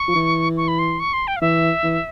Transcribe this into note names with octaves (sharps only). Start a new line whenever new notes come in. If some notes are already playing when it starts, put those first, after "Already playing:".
Already playing: C#6
F3
E3
C#6
B5
C6
C#6
C6
G5
F5
E3 E5
E3